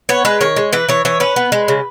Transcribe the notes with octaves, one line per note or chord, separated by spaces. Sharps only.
B3 C#5
G#3 B4
D#3 C#5
G#3
E3 B4
E3 C#5
E3 C#5
C#4 B4
B3
G#3
C#3